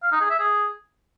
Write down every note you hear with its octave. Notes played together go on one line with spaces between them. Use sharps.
F5
D#4
G#4
E5
G#4